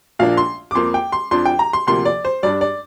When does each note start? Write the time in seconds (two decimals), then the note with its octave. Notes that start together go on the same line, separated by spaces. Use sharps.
0.19 A#1 A#2 F3 A#3 D4 F5
0.37 C6
0.71 D6
0.75 F2 F3 A#3 C6
0.94 G5
1.12 C6
1.31 F2 F3 D4 C6
1.45 G5
1.59 A#5
1.73 C6
1.87 D2 C3 F3 A#3 C6
2.05 D5
2.25 C5
2.43 G2 G3 D4 D5
2.61 D5